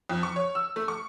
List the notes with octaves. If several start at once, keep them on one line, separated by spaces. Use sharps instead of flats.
F2
C#6
C#5
E6
A3
C#6